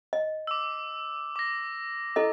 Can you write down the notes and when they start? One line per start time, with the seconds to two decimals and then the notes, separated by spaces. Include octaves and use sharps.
0.13 D#5
0.47 D6 E6
1.36 D6 A#6
2.16 E4 A4 D#5